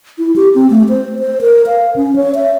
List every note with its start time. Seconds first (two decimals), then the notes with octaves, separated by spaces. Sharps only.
0.18 E4
0.36 G4
0.55 C4
0.70 A3
0.89 C5
1.19 C5
1.41 A#4
1.67 F5
1.96 C#4
2.16 C#5
2.35 E5